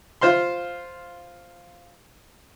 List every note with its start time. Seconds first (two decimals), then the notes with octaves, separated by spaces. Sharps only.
0.21 F4 C5 F5 C6